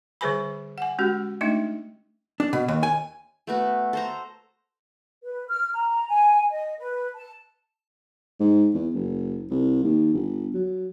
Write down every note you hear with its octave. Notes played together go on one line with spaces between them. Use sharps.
D3 G3 G#4 B4 G#5 B5
F#5 G#5
G#3 C#4 F#4 G4
A3 D4 D#4 D#5 E5
D4
B2
D#2
G#5
A3 B3 F#4
A4 C5 A#5
B4
F6
A#5
G#5
D#5
B4
A5
G#2
E2
F#1
C2
D#2
G1
F#3